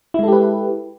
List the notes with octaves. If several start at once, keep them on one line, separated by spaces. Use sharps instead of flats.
G#3 E4 G4 A4 B4